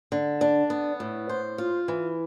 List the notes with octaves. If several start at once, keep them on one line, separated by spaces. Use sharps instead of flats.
D3
D4
B3
A2
C5
F4
E3